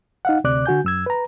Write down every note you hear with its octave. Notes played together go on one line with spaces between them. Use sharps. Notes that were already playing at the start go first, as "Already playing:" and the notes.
D#4 F5 F#5
D2 C3 D5 D6 F#6
D3 F#4 G#5 G6
F#2 E6 G#6
B4 A#5